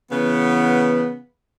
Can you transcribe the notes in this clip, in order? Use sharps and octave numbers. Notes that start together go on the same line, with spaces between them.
C#3 E3 B3